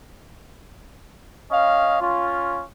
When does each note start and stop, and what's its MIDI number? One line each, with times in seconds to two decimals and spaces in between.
1.52 2.00 61
1.52 2.00 75
1.52 2.00 77
2.01 2.62 61
2.01 2.62 65